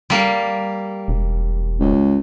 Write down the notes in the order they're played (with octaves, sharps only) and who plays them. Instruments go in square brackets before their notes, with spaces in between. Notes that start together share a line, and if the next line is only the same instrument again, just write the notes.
[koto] G3 A#3
[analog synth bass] E1
[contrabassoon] C#2